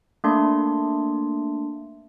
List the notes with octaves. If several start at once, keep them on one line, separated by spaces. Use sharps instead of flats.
A3 A#3 D4 C6